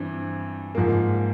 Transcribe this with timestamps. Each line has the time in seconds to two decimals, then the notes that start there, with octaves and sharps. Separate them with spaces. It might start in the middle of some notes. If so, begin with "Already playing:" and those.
Already playing: G2 E3 C4
0.75 G#2 F3 A#3